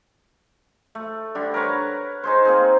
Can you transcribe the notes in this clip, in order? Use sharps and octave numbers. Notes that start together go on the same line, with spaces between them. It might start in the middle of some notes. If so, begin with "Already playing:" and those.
A3
D3 G3 D4
A#4 B4 C#5 F#5
D#4 G#4 C5
A#3 C4 G#4